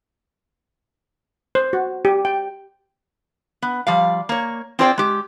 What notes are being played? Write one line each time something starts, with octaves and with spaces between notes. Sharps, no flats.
C5
F#4
G4
G5
B3
F3 G3 F5
A#3 C#5
C4 F4 G#4 C5 D5 G5
G#3 G4